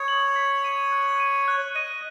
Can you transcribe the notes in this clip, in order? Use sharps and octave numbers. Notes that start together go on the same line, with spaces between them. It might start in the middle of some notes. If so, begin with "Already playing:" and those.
Already playing: C#5 D#6
F#7
B6
D#7
F#6
D#7
F#6
D#5 D#7